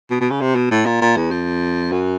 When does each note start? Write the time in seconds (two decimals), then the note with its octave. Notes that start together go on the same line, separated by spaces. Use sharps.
0.10 B2
0.21 B2
0.30 C#3
0.41 C3
0.55 B2
0.71 A2
0.86 A#2
1.01 A#2
1.16 E2
1.31 F2
1.92 F#2